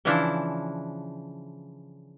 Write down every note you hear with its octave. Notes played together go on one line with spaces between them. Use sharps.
C#3 E3 F3 D4 E4